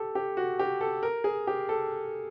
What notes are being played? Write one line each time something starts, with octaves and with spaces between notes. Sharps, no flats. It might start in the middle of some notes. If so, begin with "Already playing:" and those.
Already playing: G4 A4
G4
F#4
G4
A4
A#4
G#4
G4
A4